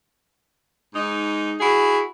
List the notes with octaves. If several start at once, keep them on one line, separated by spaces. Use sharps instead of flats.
G#2 D#4
E4 F#4 G#4